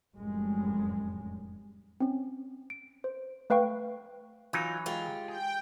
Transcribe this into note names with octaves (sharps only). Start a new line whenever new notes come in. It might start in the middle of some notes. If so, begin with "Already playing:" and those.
F1 F#2 A2 G3 G#3
C4 C#4
D7
C5
A3 B4 F5 G5 C#6
E3 F#3 D#4 F4
G#3 F4 G4
G#4 G5